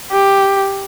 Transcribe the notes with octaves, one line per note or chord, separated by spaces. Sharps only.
G4